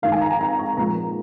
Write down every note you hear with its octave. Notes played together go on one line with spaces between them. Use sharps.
G#2 D#3 G#3 F5
G#5
A#5
G#5
A#5
C#6
A#2 F3 G#3 A#5